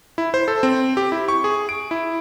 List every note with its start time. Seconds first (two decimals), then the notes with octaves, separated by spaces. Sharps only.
0.18 E4
0.34 C5
0.48 A4
0.63 C4
0.97 G4
1.12 E4
1.28 C#6
1.44 G#4
1.69 D7
1.91 E4